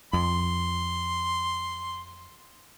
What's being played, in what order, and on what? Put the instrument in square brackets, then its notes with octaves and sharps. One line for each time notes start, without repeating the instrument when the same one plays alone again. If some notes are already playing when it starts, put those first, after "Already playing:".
[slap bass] F2 [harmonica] C6